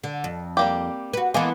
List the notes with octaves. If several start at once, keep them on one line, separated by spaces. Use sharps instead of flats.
D3
F2
G3 A#3 G4
F#4 B4
E3 G#3 A#3 B3 A4